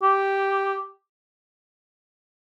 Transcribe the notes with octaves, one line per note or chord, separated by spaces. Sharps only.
G4